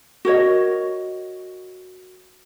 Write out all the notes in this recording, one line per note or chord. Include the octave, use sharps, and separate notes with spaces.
F#4 A#4 C#5 D#5